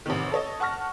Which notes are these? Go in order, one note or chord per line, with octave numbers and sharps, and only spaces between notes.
A1 C3 D#3
A4 C#5 D#5
F#5 A5 C#6 F6 A#6